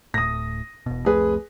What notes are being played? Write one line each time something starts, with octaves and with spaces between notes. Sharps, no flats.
D1 A2 D#6 A#6
E1 B2
C2 F2 A3 G#4 B4